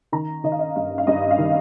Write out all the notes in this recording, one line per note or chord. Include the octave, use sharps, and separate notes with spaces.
D#3 A#5
D#3 D#5
F5
D#5
G2 F5
F5
G2 D#5
F5
D#3